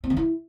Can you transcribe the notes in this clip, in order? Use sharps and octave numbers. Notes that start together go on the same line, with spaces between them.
C4
D#3
E4